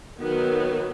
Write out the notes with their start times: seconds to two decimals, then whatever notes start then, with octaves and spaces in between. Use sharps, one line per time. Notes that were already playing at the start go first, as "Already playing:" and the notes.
0.20 D#3 F#3 B3